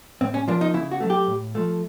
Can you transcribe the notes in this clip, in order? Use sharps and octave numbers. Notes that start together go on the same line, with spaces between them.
A2 C4
C#4
F3 A#3 D4
D#4
C#3 E4
F#4
F#3 A3
G4
A2
F3 A3